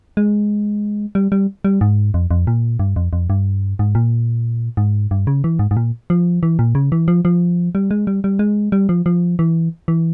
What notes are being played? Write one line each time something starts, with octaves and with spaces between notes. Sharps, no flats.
G#3
G3
G3
G3
G#2
F2
F2
A#2
G2
F2
F2
G2
G#2
A#2
G#2
G2
C#3
E3
G#2
G#2
A#2
F3
E3
A#2
C#3
E3
F3
F3
G3
G#3
G3
G3
G#3
G3
F3
F3
E3
E3